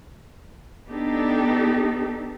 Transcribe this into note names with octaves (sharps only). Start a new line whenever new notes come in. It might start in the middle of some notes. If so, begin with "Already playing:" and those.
B3 D4 D#4 G4 A4